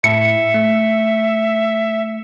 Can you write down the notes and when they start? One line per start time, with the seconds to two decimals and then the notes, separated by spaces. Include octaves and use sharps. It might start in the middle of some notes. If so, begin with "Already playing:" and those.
0.04 A2 E5 C#7
0.54 A3